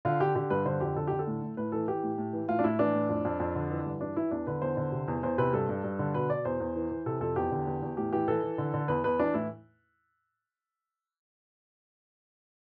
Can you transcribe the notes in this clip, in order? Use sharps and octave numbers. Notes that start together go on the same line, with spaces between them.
D3 F4
D3 G4
D3 G4
G2 B4
D3 C5
F2 G4
D3 A4
D3 G4
A4
A2
A2
A2 B4
E3 A4
E3 G4
A2
A2
E3
A2 F4
D4
A2 E4
E3 D4
A2
F2
F2
F2
D3
E3
G2
E3 D4
E3 E4
E2 D4
D3 B4
E2 C5
D3
C3
E2
E2 C5
C3 B4
G2 A4
G2
G2
D3
B2 B4
B2 D5
E2 C5
E2
E3
E3
C3 A4
F2 A4
E2 G4
D3
E2
E2
A2 G4
E3 G4
E3 A4
E3
D3
D3
E2 B4
E2 B4
E3 D4
A2 E4